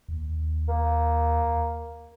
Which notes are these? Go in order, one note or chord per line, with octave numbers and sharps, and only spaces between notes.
D#2
A#3